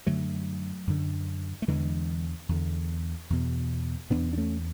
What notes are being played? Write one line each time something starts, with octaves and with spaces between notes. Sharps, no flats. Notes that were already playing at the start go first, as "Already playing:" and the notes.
F#2 D3 F#3 A3
F#2 D3
A3
E2 D3 E3 G#3
E2 D3
E2 B2
E2 B2 B3 D4
D4
A3 C#4